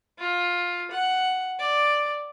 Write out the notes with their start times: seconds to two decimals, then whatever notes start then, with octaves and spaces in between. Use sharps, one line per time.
0.19 F4
0.91 F#5
1.59 D5